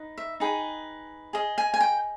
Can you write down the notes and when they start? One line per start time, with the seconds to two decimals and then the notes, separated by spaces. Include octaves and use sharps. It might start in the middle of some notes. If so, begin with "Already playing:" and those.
Already playing: D#4 B4
0.18 E5
0.40 D#4 G#4 B4 G5
1.33 G#4 D#5
1.58 G#5
1.74 G#5
1.81 G5